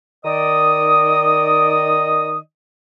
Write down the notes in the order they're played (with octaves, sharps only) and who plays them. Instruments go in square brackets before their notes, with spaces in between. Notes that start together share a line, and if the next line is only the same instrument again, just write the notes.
[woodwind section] D#3 D5 D#5 D#6